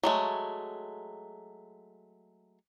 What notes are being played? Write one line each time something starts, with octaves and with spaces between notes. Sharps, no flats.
F#3 G#3 A3